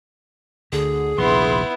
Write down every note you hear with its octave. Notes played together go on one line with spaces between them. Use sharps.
D2 D3 G#4
A#1 D#2 C3 B3 E4 C6